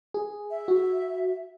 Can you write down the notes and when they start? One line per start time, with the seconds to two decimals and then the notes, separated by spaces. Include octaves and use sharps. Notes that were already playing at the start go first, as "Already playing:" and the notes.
0.14 G#4
0.51 E5
0.68 F#4